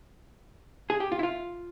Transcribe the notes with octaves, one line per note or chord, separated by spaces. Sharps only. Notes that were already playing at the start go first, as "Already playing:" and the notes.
G#4
G4
F4
E4
F4